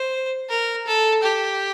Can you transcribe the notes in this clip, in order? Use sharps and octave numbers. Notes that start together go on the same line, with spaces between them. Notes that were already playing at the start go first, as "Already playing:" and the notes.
Already playing: C5
A#4
A4
G4